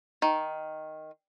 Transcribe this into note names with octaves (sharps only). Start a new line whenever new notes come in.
D#3